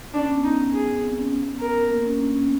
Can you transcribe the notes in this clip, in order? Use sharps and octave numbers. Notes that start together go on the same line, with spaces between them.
C#4 D4
B3
B3 D#4
G#4
C4
C#4
B3
A#4
A#3
C#4
D4
C#4
B3